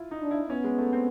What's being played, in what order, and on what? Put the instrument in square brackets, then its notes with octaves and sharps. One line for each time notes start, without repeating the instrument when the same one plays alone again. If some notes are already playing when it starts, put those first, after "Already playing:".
Already playing: [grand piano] E4 F4
D#4
[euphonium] D4
[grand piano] E4
[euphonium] B3 [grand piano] C#4
[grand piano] G#3
A3
C4